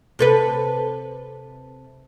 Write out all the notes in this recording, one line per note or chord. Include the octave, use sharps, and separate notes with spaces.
C3 A4 B4